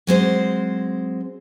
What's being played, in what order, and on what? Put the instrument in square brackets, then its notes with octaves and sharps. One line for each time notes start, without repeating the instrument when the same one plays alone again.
[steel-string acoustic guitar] F#3 G#3 C4 C5